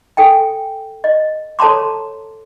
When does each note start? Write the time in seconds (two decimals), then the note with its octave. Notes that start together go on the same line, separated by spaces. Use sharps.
0.17 A4 G5 G#5
1.04 D#5
1.59 A4 C#5 A5 A#5 C6 D6